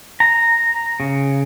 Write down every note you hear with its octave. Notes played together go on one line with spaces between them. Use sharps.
A#5
C#3